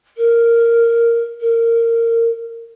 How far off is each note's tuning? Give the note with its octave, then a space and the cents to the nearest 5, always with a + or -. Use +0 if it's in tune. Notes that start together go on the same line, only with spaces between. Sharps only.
A#4 -5
A#4 -20